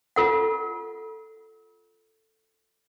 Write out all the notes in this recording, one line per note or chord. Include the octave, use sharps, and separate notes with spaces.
F4 A4 F#5